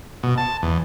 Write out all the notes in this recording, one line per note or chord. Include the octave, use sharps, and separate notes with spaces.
B2
A5
E2